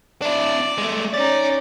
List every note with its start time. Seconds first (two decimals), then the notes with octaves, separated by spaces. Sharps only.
0.22 D4 E4 D5
0.78 G#3 A3
1.14 C#4 D#4 D5